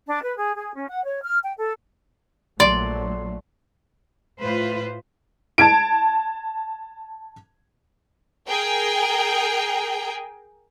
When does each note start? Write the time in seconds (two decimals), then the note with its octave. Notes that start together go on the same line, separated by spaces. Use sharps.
0.06 D4
0.22 B4
0.36 G#4
0.55 G#4
0.74 C#4
0.87 F#5
1.03 C#5
1.23 F6
1.43 G5
1.56 A4
2.60 A#1 F#3 A3 D5 C6
4.41 A2 F4 B4 C5
5.58 A5 G#6 D7
8.47 G#4 A#4 G5